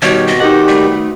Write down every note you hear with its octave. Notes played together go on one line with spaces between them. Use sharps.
B2 D#3 G3 F#4 C#5 D5
C4 D#5
D#3 D#4 G4 F#5
G3 A3